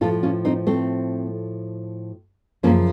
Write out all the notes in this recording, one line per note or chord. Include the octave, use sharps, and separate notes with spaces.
A2 F3 F4 A4
C#4 F4
C4 D#4
A3 C4
F#2 C#3 F3 A#3 C#4